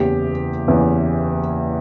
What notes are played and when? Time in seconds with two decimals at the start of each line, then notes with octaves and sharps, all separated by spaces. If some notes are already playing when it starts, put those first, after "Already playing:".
Already playing: F#1 E2 C#3 E3 G4
0.67 F#1 E2 C#3 E3